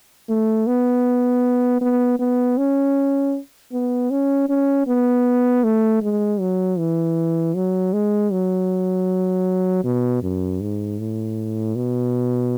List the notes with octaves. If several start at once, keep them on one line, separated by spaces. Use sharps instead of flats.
A3
B3
B3
B3
C#4
B3
C#4
C#4
B3
A3
G#3
F#3
E3
F#3
G#3
F#3
B2
F#2
G#2
A2
B2